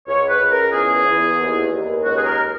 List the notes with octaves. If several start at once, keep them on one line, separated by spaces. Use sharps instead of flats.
C#2 C#5
B4
C#2
A#4
E2 G#4
E2
D#2
D#2
C#2 F#4
G#4
A#4